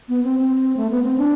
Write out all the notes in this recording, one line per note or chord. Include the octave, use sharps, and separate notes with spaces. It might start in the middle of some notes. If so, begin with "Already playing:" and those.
B3
C4
C4
A3
B3
C4
D4